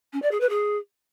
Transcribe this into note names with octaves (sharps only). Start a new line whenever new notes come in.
C#4
D5
G#4
B4
G#4